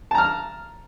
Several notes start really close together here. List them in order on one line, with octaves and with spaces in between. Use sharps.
A5 A#5 F6